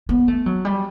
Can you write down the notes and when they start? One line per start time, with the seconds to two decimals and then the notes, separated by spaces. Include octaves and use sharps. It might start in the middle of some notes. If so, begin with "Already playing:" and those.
0.09 B3
0.28 A3
0.46 F#3
0.65 G3